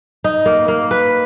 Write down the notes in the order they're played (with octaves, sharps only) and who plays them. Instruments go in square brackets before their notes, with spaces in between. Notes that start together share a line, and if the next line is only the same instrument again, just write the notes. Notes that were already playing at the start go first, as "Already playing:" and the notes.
[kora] D#4
A#3
A#3
B4